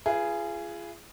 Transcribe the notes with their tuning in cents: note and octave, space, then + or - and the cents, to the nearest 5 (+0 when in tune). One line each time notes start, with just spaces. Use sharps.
F4 -35 G#4 +0 B4 -10